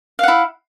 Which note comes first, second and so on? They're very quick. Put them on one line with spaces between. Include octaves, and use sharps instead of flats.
F5 F#5 E4